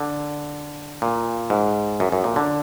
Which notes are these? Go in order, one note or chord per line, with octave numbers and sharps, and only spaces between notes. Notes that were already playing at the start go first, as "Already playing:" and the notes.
Already playing: D3
A#2
G#2
F#2
F#2
A#2
D3